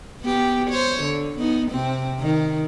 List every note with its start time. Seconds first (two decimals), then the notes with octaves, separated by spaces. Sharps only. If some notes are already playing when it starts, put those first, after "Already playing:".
0.21 B3 G4
0.70 C5 C#5
1.03 D3
1.38 B3 D#4
1.71 C3 C4
2.20 D#3